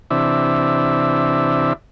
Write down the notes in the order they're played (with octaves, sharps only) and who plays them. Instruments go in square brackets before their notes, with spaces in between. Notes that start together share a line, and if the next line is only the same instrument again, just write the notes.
[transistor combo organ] C3 E3 D4 E5